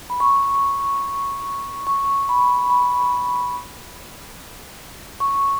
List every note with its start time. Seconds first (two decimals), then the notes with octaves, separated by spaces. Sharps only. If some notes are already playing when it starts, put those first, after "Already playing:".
0.10 B5
0.20 C#6
1.87 C#6
2.29 B5
2.70 B5
5.20 C#6